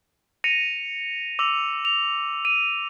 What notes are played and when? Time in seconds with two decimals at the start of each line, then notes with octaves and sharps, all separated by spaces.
0.44 A#6 C#7 D#7 F7
1.39 D6 E6 F7
1.85 F7
2.45 D#7